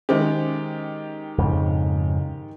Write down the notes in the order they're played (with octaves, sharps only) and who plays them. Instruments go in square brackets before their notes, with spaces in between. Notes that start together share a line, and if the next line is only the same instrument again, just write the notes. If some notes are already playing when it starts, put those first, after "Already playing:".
[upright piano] D#3 G#3 G4 [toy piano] C#4 C5 E5
[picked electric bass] F2 G#2 C#3